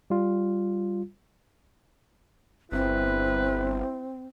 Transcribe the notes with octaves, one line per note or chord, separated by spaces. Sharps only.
G3 F4
G1 C4 E4 B4